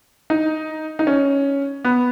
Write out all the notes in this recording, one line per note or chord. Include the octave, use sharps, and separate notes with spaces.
D#4
D#4
C#4
B3